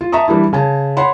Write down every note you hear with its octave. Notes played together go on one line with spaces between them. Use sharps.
F4
E5 A5 A#5 C#6 D#6
E3 G3 D4 E4
C#3 G#5 A5
C#5 F#5 B5 C6